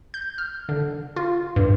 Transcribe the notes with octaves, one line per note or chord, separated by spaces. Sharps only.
G6
F6
D3
F4
G2